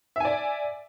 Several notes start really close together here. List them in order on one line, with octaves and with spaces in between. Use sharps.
E5 G#5 D5